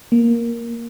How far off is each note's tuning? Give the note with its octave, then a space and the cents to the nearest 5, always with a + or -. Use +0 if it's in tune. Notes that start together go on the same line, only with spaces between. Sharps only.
A#3 +5